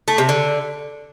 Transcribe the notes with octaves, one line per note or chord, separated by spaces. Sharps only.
A3
C3
D3